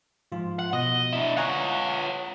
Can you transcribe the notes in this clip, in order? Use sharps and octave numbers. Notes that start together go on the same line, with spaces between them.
G#2 F3 F4
F#5
B2 D#5
D4 E4
F4 C#5 F#5 G#5 A#5